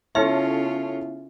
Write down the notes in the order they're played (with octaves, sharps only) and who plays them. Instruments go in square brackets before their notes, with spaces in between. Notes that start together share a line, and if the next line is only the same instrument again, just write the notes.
[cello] C#3 F4 [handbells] B3 E4 E5 [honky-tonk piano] A4 C#5